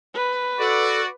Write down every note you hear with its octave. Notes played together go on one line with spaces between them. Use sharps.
B4
F#4 A4 D5